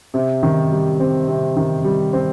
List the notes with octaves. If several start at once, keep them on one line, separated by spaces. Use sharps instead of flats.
C3
D#3
G3
C4
C3
D#3
G3
C4